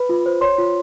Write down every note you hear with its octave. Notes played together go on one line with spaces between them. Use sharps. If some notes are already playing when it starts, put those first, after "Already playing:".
Already playing: B4 B5
F4
C5
C#5 C6
F4